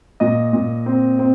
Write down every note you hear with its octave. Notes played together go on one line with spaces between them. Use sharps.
A#2 D#5
A#2
C4
C4